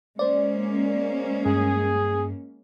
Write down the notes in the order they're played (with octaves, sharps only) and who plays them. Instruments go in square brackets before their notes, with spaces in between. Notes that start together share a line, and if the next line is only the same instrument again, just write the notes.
[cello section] G#3 A#3 C#4 [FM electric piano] C5 D5
[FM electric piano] G2 [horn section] G#4